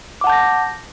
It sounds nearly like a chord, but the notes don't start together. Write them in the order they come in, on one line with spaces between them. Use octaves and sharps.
D6 F#5 A5 G6 A#6